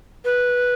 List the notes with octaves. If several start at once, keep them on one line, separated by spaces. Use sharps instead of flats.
B4